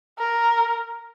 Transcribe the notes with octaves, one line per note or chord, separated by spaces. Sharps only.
A#4